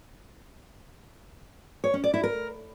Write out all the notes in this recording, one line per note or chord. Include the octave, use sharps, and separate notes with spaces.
C#5
C#4
D5
E4
A#4